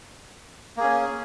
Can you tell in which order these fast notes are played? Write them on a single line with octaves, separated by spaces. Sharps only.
A#3 G#4 C#4